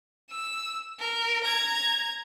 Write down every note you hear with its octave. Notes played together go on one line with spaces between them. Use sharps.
E6
A#4
A#5 G#6